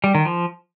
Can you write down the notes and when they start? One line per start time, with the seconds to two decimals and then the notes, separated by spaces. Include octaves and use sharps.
0.04 G3
0.15 D#3
0.25 F3